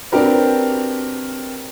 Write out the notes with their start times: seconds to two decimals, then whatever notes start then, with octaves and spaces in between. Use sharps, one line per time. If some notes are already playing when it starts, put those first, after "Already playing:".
0.12 C4 D4 F#4 G4 A#4 B4